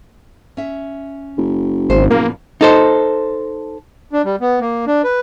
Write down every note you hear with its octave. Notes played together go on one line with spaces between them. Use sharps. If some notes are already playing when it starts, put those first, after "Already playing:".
C#4 E5
F#1
G#1 C5
A#2 F3 A#3 B3
D#4 A4 C5
D4
G3
B3
A#3
D4
B4